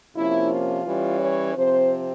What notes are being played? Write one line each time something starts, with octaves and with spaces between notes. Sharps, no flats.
C3 F3 A#3 C#4 E4
F4
E3 G3 C#4
C#5
C3 F3 C4 C5